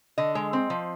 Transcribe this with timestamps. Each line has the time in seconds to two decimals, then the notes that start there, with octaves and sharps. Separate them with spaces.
0.18 D3 D#5
0.35 G#3
0.53 C4
0.70 F3